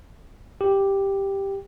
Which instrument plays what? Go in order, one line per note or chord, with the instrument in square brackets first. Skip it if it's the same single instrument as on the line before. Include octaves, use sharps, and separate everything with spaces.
[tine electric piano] G4